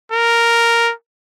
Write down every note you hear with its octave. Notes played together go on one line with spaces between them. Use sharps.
A#4